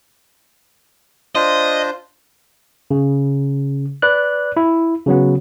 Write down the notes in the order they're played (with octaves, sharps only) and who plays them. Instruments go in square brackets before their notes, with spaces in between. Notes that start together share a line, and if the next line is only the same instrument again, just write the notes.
[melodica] D4 F4 C5 [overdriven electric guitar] D#5
[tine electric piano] C#3
B4 D5 F#6
E4
C#3 F#3 B3